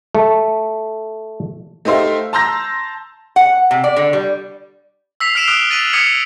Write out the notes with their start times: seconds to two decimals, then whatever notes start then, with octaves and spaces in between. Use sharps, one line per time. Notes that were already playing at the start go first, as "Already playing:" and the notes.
0.15 A3
1.85 A3 D#4 G4 C5 E5 F5
2.33 A5 A#5 C6 E6 G6 A#6
3.36 F#5
3.71 C3
3.84 D5
3.96 D3
4.13 G3
5.20 E6 B6 C7 F7 F#7
5.35 F6 B6 C7 D7 E7 F7
5.47 D#6 F6 F#6 D7 E7 G7
5.70 F#6 A6 B6 D#7 F#7
5.93 D#6 F6 G#6 B6 C#7 D#7